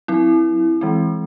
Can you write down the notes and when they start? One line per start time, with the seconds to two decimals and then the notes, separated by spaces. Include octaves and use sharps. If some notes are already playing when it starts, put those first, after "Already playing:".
0.08 F#3 C4 E4
0.81 E3 G#3 C4